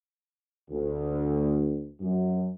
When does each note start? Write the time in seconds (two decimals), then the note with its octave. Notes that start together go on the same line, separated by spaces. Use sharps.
0.69 D2
2.01 F#2